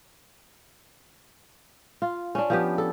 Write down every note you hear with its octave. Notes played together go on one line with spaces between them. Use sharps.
F4
C#4 D4
F3 B3 G4
A4